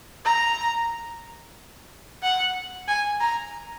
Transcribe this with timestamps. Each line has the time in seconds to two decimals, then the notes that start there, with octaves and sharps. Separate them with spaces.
0.25 A#5
2.22 F#5
2.88 G#5
3.20 A#5